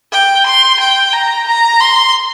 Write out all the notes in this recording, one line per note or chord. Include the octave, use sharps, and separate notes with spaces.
G5
C6
G5
A#5
A#5
C6